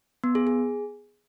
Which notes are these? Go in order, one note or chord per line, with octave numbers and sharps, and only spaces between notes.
B3
G#4
G#4